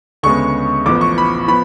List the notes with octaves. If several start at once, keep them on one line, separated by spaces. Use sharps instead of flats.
D2 C#3 G#3 B3 C#6
A1 A2 F3 B3 D6
C#6
B5
F3 B3 B5